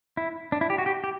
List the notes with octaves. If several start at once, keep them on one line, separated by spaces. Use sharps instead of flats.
E4
D4
E4
G4
F#4
G4
G4